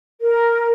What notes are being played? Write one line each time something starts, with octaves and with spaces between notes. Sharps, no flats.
A#4